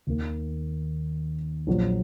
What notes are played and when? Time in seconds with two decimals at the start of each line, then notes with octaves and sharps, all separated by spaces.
0.07 D#2 D#3 A#3
1.67 A#1 A#2 F#3